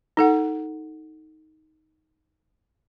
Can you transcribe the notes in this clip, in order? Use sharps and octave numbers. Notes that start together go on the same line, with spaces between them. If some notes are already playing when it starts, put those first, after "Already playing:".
D#4 A4 F#5